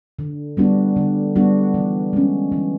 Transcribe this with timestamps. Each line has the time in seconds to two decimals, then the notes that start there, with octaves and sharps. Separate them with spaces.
0.19 D3
0.57 G3 B3 D4 F#4
0.96 D3
1.35 G3 B3 D4 F#4
1.74 E3
2.13 G#3 C#4
2.52 E3